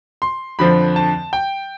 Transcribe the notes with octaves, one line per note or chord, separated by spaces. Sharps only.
C6
F2 D3 F3 C4 B5
A5
G5